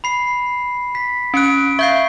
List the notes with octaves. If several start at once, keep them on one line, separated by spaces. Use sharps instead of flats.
B5 C7
B6
C#4 F#6 C#7 D7
E5 F5 C#6 G6 C7